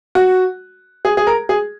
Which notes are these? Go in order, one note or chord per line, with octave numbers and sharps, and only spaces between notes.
F#4
G#4
G#4
A#4
G#4